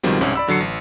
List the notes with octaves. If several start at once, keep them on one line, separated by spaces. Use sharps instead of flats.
C#2 B2 D#3 F3 G3 C4
C2 G#2 C#4
D5 B5 E6
A1 D3 F#3 C7 C#7
A1